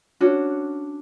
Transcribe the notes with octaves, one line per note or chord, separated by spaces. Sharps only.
C#4 D4 F#4